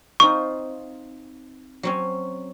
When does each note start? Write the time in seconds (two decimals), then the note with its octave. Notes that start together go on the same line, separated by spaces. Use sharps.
0.20 C4 D#4 F4 C#6
1.83 F#3 C4 C#4